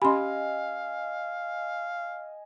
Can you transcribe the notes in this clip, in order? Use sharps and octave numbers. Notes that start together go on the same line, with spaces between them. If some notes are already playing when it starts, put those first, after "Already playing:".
C#4 G4 D#5 F5 G#5 B5 C6